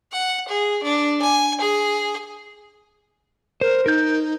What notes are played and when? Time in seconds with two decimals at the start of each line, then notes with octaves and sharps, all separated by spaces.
0.12 F#5
0.48 G#4
0.83 D4
1.22 G#5
1.61 G#4
3.61 A#4 C5
3.86 D#4 A#4 G6